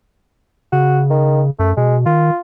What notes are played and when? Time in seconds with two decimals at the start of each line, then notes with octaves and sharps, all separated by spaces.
0.73 C#3 F#4
1.10 D#3
1.59 F#2 A3
1.77 B2 G#3
2.06 D#3 F4